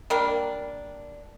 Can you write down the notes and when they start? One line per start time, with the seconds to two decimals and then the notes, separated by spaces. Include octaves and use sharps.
0.10 G3 A#3 D4